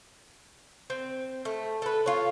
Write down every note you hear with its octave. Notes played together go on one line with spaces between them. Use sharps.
C4
A3
A4 B4
F4 C#5